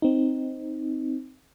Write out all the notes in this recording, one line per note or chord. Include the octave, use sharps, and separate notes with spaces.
C4 D#4